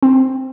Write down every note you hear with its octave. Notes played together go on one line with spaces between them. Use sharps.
C4